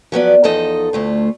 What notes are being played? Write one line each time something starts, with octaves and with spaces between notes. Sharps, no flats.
F3 F#3 B3 D5
E2 F3 D#4 A4 D#5
D2 A3 F4